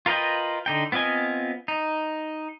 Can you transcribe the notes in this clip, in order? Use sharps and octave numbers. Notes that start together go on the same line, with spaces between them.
F4 A#4 B4 D#5 G5
D3 D#4 G5
B3 C4 F4 D#5 G#5
D#4